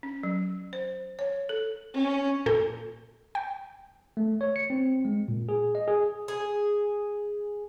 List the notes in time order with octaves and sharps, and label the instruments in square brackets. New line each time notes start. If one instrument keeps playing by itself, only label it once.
[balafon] C#4
F#3
C5
C#5
A4
[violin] C#4
[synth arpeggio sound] A#2 A4 G6
G5
[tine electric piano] A3
C#5
C#7
C4
G#3
A#2
G#4
D#5
G#4
[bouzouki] G#4